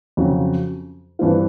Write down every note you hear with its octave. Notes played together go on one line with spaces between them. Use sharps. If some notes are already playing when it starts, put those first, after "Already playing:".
F2 C#3 F#3
G2 E3 G3 C4 F4